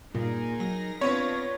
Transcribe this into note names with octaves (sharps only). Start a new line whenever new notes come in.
G2 A#2 D#4 G#4 A#4
F#3 A#6
B3 C4 D4 F4 B4 C#5